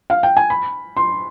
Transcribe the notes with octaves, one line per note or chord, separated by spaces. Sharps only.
F5
G5
G#5
B5
C6